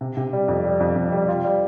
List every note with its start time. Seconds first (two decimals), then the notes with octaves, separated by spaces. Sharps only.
0.01 C3
0.17 C3
0.33 G3
0.48 F2
0.65 G3
0.80 F2
0.96 F2
1.12 G3
1.28 F4
1.45 G3